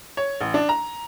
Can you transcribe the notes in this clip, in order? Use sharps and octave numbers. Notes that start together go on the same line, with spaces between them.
C#5
A1
D4
A#5